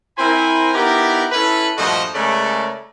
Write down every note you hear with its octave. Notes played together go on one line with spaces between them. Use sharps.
C4 E4 A#4 C5 G#5 B5
B3 D#4 E4 G4 A#4
C#4 E4 A4 B4
G2 A#2 F3 A3 F#4 D#5
C#3 G#3 A3 C#4 A#4 D5